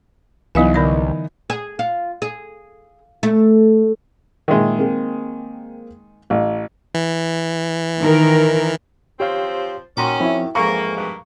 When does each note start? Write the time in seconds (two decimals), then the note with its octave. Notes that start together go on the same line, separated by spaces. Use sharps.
0.55 C2 E3 F#3 B3 D#4 F5 G#5
0.74 D3 D5 D#5
1.50 G#4
1.79 F4
2.22 G#4
3.23 A3
4.48 A#2 D#3 G#3 E5
4.79 A#3 C4 G#4
6.30 A1 F5
6.95 E3
8.00 D#3 A#4
9.20 F3 C4 G4 C5 C#5 F5
9.97 A#2 D#3 C#4 F#4 A#5 C6 D6
10.20 F3 C4 E4 E5
10.55 F2 G#2 E3 A#3 A#5 C#6
10.97 G2 B2 A#3